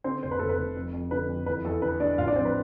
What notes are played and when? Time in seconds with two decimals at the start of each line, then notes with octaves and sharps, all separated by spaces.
0.04 D3 C4 C5
0.22 F1 C5
0.31 B4
0.39 F1 A4
0.49 B4
0.57 F1
0.76 F2
0.93 F2
1.11 D3 B4
1.29 F2
1.46 E2 B4
1.65 E2 A4
1.82 D3 B4
2.00 G#3 D4 D5
2.18 A1 F4 F5
2.27 D4 D5
2.36 F3 C4 C5
2.45 B4